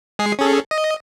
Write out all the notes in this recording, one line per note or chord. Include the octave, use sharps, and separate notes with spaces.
G#3 G#4 C7
C#4 G#4 A4
D#5